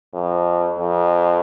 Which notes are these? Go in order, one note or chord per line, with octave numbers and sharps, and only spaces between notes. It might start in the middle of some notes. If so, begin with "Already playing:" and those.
F2
F2